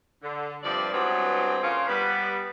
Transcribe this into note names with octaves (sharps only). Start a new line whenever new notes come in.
D3
G2 C3 F3 D5
G2 E3 F#3 G#3 B3 C4
C#3 A#3 C#4 F4
G3 B3